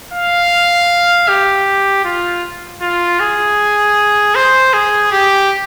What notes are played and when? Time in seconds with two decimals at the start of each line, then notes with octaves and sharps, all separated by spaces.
0.13 F5
1.29 G4
2.05 F4
2.82 F4
3.20 G#4
4.35 C5
4.74 G#4
5.12 G4